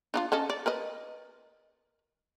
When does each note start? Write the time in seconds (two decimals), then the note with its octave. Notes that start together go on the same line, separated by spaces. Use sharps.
0.14 D4 D#4 F4
0.32 C#4 A4 D#5
0.50 D5
0.66 A#4 B4 D#5